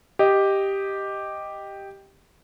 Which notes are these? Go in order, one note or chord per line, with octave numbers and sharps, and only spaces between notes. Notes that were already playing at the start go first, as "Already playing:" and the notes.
G4 D#5